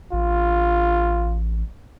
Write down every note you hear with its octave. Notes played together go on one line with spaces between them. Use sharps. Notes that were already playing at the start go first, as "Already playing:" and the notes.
A1 F4